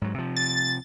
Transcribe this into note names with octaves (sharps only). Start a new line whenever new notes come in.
G#2 F#3
C3 F3
A6